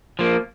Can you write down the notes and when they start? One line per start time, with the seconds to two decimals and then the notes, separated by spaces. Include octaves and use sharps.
0.19 F3 A#3